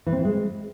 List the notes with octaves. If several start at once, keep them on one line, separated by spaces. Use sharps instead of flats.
E3
C4
E3
G#3